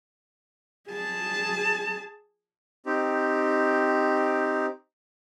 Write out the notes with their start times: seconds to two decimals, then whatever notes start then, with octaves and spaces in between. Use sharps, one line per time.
0.90 G#4 A5
2.86 C4 D#4 G4